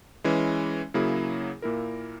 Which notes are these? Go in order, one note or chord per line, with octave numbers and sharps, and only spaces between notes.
E3 G#3 C#4 E4
C#3 F#3 A#3 E4 G#4
A#2 A#3 E4 A#4